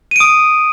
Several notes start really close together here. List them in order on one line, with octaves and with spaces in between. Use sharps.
D#7 D7 D#6